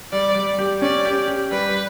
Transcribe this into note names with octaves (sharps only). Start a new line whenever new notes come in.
G3 D5
G3
G4
C#4 D5
G4
G4
G3 B4